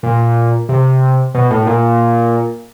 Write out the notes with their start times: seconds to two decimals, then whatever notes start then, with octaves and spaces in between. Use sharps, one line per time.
0.03 A#2
0.69 C3
1.35 B2
1.50 A2
1.67 A#2